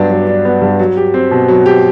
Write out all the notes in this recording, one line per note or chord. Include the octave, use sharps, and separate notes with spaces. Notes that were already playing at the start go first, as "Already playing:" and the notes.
Already playing: G2 F#3 B3 D4
F#3
D4
B3
G2
F#3
G4
C4
B2
F#3
G4